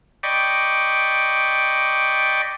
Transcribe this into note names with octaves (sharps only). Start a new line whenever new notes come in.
D5 D#5 G5 B5 C#6 D6